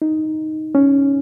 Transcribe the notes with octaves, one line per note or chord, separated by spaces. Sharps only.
D#4
C#4